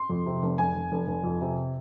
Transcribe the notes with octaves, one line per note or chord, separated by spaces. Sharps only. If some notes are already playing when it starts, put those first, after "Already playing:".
Already playing: C6
F2
C3
F1
F1 G#5
F1
F1
F1
F2
C3